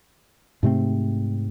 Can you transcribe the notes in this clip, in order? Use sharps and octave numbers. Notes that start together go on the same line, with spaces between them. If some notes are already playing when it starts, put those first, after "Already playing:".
G#2 C3 A3 C4